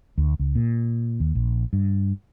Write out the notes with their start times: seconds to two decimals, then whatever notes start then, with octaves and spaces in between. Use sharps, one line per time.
0.18 D2
0.39 C#2
0.55 A#2
1.20 D#2
1.35 A#1
1.73 G2